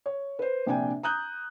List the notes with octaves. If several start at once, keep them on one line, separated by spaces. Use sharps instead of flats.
C#5
B4 C5
A#1 C3 D4 G5 G#5
A#5 D#6 F#6 G6